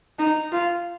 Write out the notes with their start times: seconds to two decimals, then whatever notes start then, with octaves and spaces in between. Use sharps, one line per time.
0.19 D#4
0.52 F4